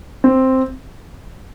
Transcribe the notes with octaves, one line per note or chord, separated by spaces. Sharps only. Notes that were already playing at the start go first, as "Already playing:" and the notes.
C4